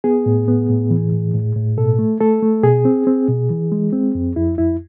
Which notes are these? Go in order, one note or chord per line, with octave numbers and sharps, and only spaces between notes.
B3 G#4
A2
B3
A2
E3
A2
A2
A2
B2 A4
A3
A3 A4
A3
B2 G#4
C4
C4
B2
E3
G#3
C4
F2
F2 E4
F2 E4